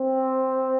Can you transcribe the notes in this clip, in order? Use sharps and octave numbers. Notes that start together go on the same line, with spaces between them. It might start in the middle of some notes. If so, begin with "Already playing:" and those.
Already playing: C4